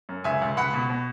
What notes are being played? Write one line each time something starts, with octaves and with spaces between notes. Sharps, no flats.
F#2
C#2 E5 G#5
C#2
C#2 F#5 B5
B2
B2